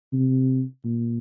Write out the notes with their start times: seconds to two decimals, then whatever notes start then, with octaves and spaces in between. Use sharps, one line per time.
0.13 C3
0.85 A#2